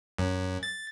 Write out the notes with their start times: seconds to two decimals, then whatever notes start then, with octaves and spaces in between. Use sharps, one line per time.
0.18 F#2
0.63 A6